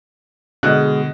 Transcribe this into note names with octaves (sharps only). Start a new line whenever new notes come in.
B2 D3 G#3 D#5 F#6